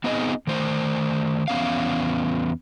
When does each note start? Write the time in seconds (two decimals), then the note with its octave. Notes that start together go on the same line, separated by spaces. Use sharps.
0.04 B3 C4 D#4 G#4 D#5
0.47 D#3 A3 C5
1.48 E2 B3 C#4 F5